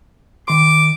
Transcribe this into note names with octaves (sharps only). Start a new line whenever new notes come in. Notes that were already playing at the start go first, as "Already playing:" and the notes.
D#3 C6 D6